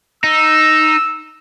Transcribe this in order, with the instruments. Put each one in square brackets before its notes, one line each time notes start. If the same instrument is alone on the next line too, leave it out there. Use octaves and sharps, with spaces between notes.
[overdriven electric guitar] D#4 [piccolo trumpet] E6